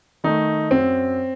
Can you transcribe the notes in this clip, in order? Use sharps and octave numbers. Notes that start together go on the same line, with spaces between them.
D#3 A3 D#4
F#2 C4